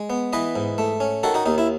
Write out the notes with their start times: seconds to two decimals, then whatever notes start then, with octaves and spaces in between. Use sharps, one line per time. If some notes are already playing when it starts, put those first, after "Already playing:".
Already playing: G#3
0.10 B3
0.33 E3 B4 D#5
0.55 G#2
0.78 A3
1.00 C#4
1.23 D#3 F#4 A4
1.34 D#4 F#4
1.46 D#2 D#4
1.58 E4